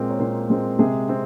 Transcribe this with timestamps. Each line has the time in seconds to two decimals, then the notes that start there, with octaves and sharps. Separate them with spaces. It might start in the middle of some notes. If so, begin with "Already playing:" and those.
Already playing: A#2 G#3 A#3 C4 A#4
0.10 C#5
0.20 A#2 C4 C5
0.50 G#3 C4
0.79 C3 G#3 G#4
1.09 C4